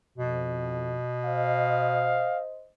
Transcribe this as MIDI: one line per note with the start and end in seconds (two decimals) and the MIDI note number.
0.18 1.00 41
0.18 2.29 47
1.25 2.70 72
1.25 2.70 75
1.25 2.41 77